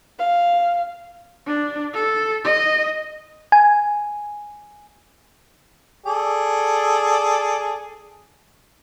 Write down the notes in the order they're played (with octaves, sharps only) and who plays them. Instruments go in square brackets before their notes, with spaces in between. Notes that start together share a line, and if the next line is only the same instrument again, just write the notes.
[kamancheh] F5
[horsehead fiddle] D4
A4
D#5
[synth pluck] G#5
[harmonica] G#4 A4 D5